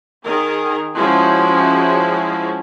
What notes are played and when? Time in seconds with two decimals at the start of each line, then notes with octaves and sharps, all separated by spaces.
0.24 D#3 G#4 A#4
0.95 F3 G#3 C#4 E4 F#4